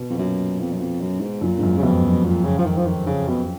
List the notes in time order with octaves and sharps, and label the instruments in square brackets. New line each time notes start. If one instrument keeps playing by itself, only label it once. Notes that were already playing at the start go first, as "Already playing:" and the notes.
Already playing: [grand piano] B2
[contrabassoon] F2
[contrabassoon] F#2 [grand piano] A#2
[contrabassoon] F2
F#2
F2
F#2
G#2
[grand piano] F#2 [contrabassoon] A#2
[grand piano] G#2
F#2
[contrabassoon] C#3
[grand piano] F2 [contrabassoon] B2
[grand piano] F#2
[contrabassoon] A#2
C#3
F3
D#3
F3
D#3
C#3
B2